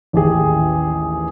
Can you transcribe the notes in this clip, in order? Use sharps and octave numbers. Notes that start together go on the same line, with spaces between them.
A1 D#2 G4 G#4